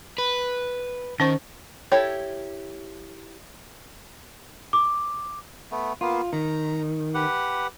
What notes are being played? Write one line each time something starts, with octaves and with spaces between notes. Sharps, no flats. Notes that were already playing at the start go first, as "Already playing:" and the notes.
B4
D#3 C#4 C5 C#6
E4 G4 A4 C#5
D6
A3 B3
A#3 B3 F4
D#3 A#5
G4 B4 F#5